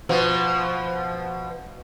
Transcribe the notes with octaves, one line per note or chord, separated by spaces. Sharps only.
B2 F3